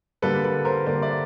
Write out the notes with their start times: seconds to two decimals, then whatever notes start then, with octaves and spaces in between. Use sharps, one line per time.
0.22 D3 G3 A#3 A4 B4
0.45 A4 B4
0.65 A#4 C5
0.86 D3 G3 A#3 C5 D5
1.02 D5 E5